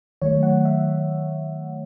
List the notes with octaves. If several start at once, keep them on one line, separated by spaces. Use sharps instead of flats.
D#3 F#3 A3 C#5
F#5
E5